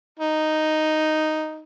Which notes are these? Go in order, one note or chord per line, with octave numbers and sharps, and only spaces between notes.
D#4